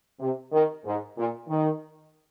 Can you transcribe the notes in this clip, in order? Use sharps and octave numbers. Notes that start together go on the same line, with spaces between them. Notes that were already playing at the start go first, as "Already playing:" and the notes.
C3
D#3
G#2
A#2
D#3